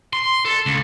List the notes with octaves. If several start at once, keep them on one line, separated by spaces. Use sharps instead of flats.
C6
A4
C#2